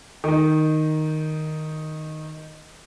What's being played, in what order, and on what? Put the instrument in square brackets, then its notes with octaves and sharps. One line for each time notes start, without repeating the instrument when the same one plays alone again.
[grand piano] D#3 D#4